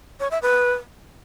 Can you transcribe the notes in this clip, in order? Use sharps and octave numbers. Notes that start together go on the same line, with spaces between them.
C#5
E5
B4